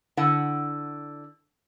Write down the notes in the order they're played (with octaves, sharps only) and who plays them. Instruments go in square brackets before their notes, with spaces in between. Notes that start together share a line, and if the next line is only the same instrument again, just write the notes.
[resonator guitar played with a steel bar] D3 E4 F#5